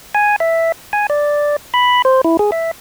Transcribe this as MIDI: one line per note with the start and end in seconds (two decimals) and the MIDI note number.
0.15 0.36 80
0.40 0.72 76
0.93 1.07 80
1.10 1.56 74
1.74 2.02 83
2.05 2.21 72
2.24 2.37 64
2.39 2.51 68
2.52 2.71 76